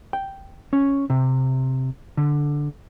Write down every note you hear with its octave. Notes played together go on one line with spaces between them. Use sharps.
G5
C#4
C3
D3